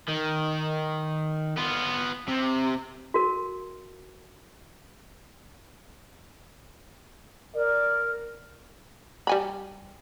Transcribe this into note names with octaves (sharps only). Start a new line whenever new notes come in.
D#3
B3 F4
C3
F#4 A#4
A#4 D5
G3 G#5 B5